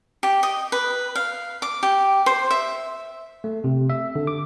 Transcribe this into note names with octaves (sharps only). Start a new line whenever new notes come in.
G4
D#5
B4
F5
D6
G4
C5
E5
A3
C3
E5
D3
D6